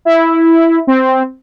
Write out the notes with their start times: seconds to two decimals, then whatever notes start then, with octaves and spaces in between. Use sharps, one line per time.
0.05 E4
0.87 C4